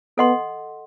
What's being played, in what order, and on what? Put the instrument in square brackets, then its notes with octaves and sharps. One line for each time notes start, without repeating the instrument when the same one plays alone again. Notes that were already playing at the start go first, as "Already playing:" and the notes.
[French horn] B3 [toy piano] A4 D#5 F#5 C6